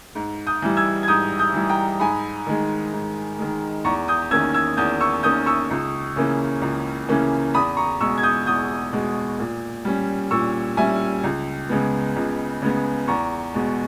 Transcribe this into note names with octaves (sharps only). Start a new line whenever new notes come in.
G#2
D#6 G6
E3 G3
E6 G#6
G#6
G#2 D#6 G6
D#6 G6
E3 G3
G5 A#5
G#2 G#5 B5
D#3 G#3
G#2
D#3 G#3
E2 A#5 C#6
D#6 G6
D#3 A#3 C#4 E6 G#6
E6 G#6
E2 D#6 G6
C#6 E6
D#3 A#3 C#4 D#6 G6
C#6 E6
C#2
C#3 E3 A#3 C#4
C#2
C#3 E3 A#3 C#4
E2 B5 D#6
A#5 C#6
B2 G#3 C#6 E6
G#6
D#6 G6
E2 D#6 G6
B2 G#3
A#2
G3 C#4
A#2 C#6 E6
G3 C#4 E5 G#5
C#2
C#3 G#3 B3
C#2
C#3 G#3 B3
E2 A#5 C#6
B2 G#3